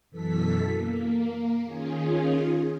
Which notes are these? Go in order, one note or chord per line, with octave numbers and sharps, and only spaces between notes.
F#2 B2 E3 A4 B6
A#3
D#3 C#4 F4 G#4